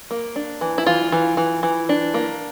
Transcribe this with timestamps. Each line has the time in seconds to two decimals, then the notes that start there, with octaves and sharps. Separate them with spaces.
0.11 A#3
0.36 D4
0.61 E3
0.78 E4
0.86 E3 F4
1.12 E3
1.37 E3
1.63 E3
1.89 D4
2.14 A#3